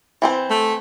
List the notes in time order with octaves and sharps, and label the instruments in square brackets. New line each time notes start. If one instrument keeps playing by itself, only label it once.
[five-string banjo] E3 C4 C5
[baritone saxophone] A3